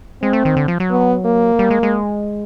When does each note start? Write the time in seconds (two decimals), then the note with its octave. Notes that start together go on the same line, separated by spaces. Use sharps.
0.22 G#3 C4
0.33 A3
0.45 D#3
0.57 D3
0.68 F3
0.80 F#3
0.91 B3
1.25 A#3
1.59 G3
1.71 G#3
1.83 G#3